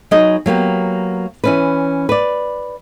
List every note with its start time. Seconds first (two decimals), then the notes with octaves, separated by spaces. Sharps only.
0.11 F#3 D#4 G#4 B4 D#5
0.46 F#3 A#3 B3 G4
1.44 E3 C#4 B4
2.09 B4 D5